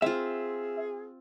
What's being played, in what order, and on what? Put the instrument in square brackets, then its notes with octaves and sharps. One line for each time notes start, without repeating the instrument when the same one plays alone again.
[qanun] C4 F4 [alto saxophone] G#4 [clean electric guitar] E5